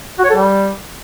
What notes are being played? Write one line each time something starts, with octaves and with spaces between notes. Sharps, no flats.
F#4
C#5
A4
G3